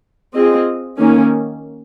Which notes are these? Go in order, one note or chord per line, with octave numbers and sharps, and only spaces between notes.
C4 F4 G#4 D#5
D#3 A#3 C#4